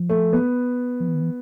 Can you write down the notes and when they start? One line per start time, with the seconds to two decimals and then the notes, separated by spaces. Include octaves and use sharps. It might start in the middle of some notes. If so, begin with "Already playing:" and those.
Already playing: F3
0.09 A3
0.33 B3
1.00 F3
1.08 E3
1.15 D#3
1.21 E3